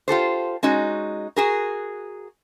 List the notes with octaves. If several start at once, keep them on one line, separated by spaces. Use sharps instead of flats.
F4 G4 A4 C5
G#3 C#4 D#4 F#4
F#4 G#4 A#4